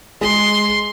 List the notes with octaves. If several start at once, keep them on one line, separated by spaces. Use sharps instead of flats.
G#3 C6